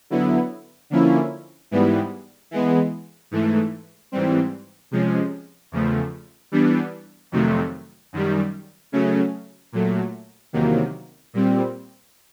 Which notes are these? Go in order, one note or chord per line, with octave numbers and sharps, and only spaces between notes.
D3 F#3 B3 E4
D3 F3 A#3 C#4 E4
G#2 E3 G3 B3
E3 G#3 B3
G#2 E3 A3
G#2 E3 G3 C4
C3 F3 G#3 C#4
E2 C#3 F3 A3
E3 G3 B3 D4
F2 C3 D#3 F#3 A3
F#2 D#3 G3
C#3 F#3 A3 C#4
A#2 F#3 A3
E2 C3 D#3 F#3 A#3
A#2 G3 C4